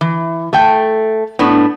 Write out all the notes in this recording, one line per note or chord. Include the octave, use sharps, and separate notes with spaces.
E3
A3 A4 G5
A2 B3 D4